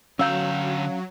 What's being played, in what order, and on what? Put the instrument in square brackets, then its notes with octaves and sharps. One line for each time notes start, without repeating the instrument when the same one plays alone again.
[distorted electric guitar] D3 A#5 [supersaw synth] F#3 [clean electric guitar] C#4 F5 [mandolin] E6 F6 G6